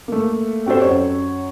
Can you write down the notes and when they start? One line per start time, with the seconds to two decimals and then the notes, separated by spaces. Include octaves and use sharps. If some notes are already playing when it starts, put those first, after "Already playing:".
0.08 A3 A#3
0.66 C4 F#4 G4 A4 C5
0.82 F#2 C#5